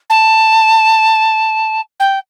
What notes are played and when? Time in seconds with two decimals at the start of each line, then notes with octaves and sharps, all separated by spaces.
0.10 A5
2.00 G5